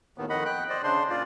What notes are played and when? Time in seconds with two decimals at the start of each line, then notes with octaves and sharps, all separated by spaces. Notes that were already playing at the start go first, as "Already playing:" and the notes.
0.18 D#2 A2 D#3 B3
0.30 F2 D#3 D#5 F#5 B5
0.45 G5 F#6
0.69 C5 D5 D#5
0.83 C#3 D4 C5 C6
1.10 A#2 F4 D5